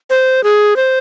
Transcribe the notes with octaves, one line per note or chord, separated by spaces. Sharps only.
C5
G#4
C5